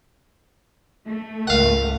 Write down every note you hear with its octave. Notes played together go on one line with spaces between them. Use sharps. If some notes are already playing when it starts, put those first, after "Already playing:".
A3
C#2 G#2 A#4 F5 F#5